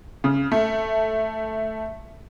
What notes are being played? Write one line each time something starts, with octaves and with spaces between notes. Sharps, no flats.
C#3
A3